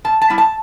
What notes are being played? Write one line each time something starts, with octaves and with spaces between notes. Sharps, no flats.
B2 A5
A5
G3 B3 E4
A5